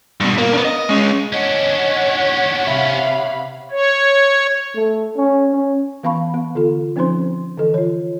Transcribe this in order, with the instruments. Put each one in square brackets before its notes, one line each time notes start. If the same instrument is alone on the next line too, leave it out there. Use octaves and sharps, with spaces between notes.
[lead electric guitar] G2 B2
A#3
B3 D4
D#5
G#3 C#4
[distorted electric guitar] C#4 D4 [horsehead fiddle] C#5 F#5 [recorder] D#5
[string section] C3 F5 B5 [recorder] E5
[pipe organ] C#5
[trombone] A3
C#4
C#4
[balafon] E3 B3 F5 A5 B5 C#6
B3
D3 F4 A4
F3 C4 C#4 D#4 C5 C6
D3 E3 A4 D#5
F4 C#5